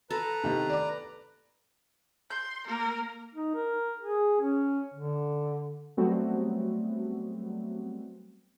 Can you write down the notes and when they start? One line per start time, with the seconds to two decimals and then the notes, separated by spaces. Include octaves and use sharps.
0.10 A4 B4 A#5
0.44 C3 D#3 B3
0.70 D5 D6
2.31 C6 G6
2.67 A#3 A#4
3.35 D#4
3.55 A#4
4.00 G#4
4.41 C#4
4.94 D3
5.97 F#3 G3 A3 B3 C4 F#4